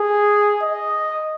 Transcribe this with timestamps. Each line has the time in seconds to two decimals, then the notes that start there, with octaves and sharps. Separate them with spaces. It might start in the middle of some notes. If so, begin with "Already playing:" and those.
Already playing: G#4
0.62 D#5